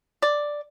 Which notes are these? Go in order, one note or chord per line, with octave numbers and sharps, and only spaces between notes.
D5